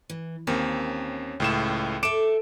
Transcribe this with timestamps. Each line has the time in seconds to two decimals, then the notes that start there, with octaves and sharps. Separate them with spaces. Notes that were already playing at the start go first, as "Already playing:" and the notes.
0.10 E3
0.47 D#2 A#3 C4 C#4
1.40 C#2 A2 E7
2.03 A4 E5 D6 D7 E7